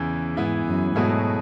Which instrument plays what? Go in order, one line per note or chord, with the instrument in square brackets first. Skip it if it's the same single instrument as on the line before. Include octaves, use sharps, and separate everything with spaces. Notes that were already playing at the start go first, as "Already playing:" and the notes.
Already playing: [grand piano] E2 C#3 E3
[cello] G#2 [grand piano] E3 B3 E4 G#4
[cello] F#2
[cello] G#2 [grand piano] B2 F#3 A3 E4 G#4